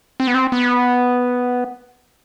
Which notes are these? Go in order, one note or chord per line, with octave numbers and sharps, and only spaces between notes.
C4
B3
C4
B3